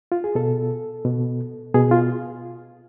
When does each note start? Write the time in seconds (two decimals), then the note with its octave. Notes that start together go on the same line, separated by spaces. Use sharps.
0.12 F4
0.24 G#4
0.35 B2 A4
1.05 B2
1.74 B2 G#4
1.91 F4